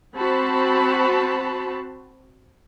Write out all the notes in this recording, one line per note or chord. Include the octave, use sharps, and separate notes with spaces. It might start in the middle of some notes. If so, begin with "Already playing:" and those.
C4 F#4 C5 A5 B5